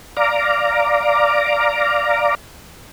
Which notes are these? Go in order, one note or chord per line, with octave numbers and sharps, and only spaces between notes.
D5 F5 A#5 D6